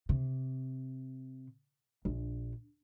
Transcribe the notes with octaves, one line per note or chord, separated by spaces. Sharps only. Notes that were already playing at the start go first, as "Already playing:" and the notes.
C3
A#1